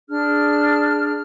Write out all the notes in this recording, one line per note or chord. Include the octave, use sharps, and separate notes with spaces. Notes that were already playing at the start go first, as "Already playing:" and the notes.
D4 G#4 F6